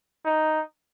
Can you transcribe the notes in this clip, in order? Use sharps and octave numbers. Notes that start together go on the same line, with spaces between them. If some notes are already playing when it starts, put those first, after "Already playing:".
D#4